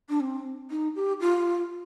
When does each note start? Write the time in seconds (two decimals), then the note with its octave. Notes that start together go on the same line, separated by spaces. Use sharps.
0.09 D4
0.20 C4
0.70 D#4
0.95 G4
1.20 F4